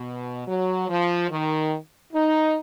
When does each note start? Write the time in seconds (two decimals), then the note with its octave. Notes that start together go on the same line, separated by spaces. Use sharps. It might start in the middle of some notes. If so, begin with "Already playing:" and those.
Already playing: B2
0.47 F#3
0.88 F3
1.29 D#3
2.13 D#4